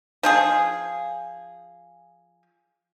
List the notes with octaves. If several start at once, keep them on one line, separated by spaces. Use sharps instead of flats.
F3 F4 G#4